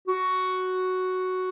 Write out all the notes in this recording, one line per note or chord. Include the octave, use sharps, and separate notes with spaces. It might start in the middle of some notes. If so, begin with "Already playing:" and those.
F#4